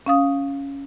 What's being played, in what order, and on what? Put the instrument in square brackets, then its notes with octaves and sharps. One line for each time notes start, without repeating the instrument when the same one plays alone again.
[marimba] C#4 F5 D#6